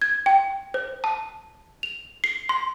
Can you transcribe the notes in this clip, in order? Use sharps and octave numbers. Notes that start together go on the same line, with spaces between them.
G#6
G5
C5
A5
F7
C7
C6